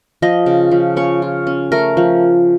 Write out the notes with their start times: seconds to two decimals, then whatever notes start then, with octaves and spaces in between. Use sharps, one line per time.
0.22 F3 D#5
0.46 C#3
0.71 F3
0.96 C#4 C#5
1.22 F4
1.47 C#4
1.72 A3 A#4
1.97 F3